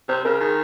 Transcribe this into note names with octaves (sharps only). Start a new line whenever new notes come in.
C3 C5
C#3 A#4
D#3 G#4